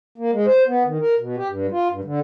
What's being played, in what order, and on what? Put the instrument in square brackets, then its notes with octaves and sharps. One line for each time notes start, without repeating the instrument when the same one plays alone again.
[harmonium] A#3
G#3
C5
B3
D#3
A#4
B2
G4
G2
F4
G2
D3